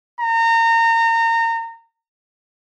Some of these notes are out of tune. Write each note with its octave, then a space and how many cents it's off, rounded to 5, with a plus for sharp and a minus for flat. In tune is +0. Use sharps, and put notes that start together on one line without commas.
A#5 -30